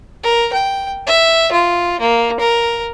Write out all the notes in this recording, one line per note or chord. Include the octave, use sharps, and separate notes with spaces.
A#4
G5
E5
F4
A#3
A#4